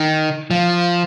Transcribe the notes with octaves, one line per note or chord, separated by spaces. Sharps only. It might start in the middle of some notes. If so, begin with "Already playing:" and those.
Already playing: D#3
F3